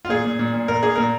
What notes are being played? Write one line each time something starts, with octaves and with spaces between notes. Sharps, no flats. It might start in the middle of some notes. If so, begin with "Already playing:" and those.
F4
A#2 G#4
A#2
A#2
A#2
A#2 A#4
A#3 G#4
A#2 A#4